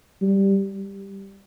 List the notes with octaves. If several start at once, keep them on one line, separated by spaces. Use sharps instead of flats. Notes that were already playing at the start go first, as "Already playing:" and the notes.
G3